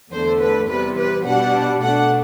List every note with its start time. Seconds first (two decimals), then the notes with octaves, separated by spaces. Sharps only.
0.12 E2 D3 A3 C5
0.40 B4
0.69 E2 C3 G3 B4
0.97 B4
1.25 B2 G3 D4 F#5
1.82 B2 A3 D4 F#5